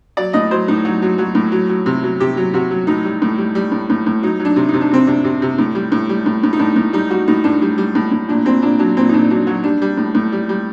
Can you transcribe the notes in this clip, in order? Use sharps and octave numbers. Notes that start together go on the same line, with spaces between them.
F#3 D5
A2 D#5
F#3 C5
A2 D#4
F#3 F#4
F#3
F#3 F#4
A2
F#3
F#3
C3
F#3
C3 G4
F#3
C3 F#4
F#3
A2 D#4
G3
A2
G3
G3
A2
A2
A2
F#3 D#4
F#3
D4
C3
C3 D#4
D4
C3 C4
C3 D4
C3
C3
A2
G3
A2
G3
A2
A2
D#4
A2 D4
A2
G3 D#4
G3 F#4
A2 D#4
A2 D4
G3
G3
A2
A2
A#2 D4
A#2 C4
A#2 D4
F#3 D4
A#2 C4
D#4
A#2 D4
F#3 D4
F#3 F#4
G3 D4
G3
A2
A2
G3
G3